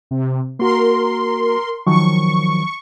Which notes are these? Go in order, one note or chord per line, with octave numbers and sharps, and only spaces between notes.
C3
A#3 F#4 A#4 C6
D#3 F3 F#3 C#6